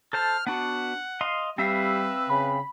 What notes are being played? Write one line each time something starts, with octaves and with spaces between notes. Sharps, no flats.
A4 C5 A5 F6
B3 D4 F#4 F#5
D#5 F5 C6
G3 C4 B4 E5 F5 E6
C#3 B5